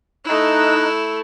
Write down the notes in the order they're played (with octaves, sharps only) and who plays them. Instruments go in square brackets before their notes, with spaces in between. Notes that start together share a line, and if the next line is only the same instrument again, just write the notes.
[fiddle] A3 E4 [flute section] D#4 F#6